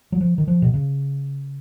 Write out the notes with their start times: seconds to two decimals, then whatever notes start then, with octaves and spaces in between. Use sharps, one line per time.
0.12 F#3
0.21 F3
0.38 D#3
0.48 F3
0.62 B2
0.74 C#3